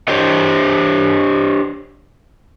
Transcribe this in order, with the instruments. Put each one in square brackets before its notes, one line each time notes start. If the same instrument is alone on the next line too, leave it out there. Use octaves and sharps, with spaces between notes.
[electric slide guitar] D4 G4 C5 C#5 D#5